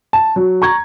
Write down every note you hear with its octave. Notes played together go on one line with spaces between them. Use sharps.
A5
F#3
A#5 C#6 G#6